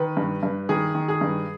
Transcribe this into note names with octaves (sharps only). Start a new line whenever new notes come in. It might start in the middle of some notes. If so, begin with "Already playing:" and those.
Already playing: D#3 B4
G2
G2
D#3 G#4
D#3
G#4
G2